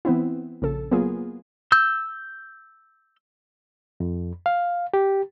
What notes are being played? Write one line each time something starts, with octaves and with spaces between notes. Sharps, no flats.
E3 B3 C4 E4
A#1 C#3 A4
F#3 A#3 B3 F4 G#4
E6 G6
F2
F5
G4